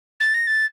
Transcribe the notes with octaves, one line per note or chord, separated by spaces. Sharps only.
A6
A#6
A6